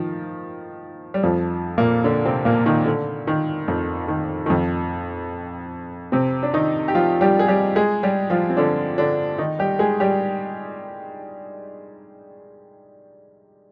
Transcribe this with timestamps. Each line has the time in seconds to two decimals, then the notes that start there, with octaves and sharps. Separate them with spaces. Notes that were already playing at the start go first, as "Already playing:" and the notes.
Already playing: D#3 F3
1.14 G3
1.23 F2 F3
1.78 A#2 A#3
2.04 D3 D4
2.25 C3 C4
2.45 A#2 A#3
2.66 D#3
2.86 D3
3.27 D#3
3.68 F2 F3
4.08 D#3
4.46 D#3
4.50 F2 F3
6.12 C3 C4
6.43 D4
6.54 D#3 D#4
6.88 G4
6.94 F3 F4
7.21 G3 G4
7.39 G#4
7.48 G3 G4
7.76 G#3 G#4
8.03 G3 G4
8.30 F3 F4
8.50 C4
8.57 D3 D4
8.98 D3 D4
9.38 D#3 D#4
9.59 G3 G4
9.79 G#3 G#4
10.00 G3 G4